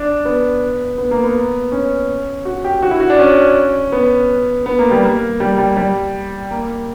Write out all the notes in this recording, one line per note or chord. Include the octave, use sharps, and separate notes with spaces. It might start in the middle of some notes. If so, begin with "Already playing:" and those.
Already playing: D4
B3
B3
A#3
B3
C#4
F#4
G4
F#4
E4
F#4
D4
C#4
B3
B3
A#3
G3
A#3
G3
G3
G3
A#3